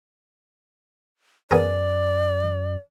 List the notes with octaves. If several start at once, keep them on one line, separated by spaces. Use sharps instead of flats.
F#2 B3 G#4 A#4 D5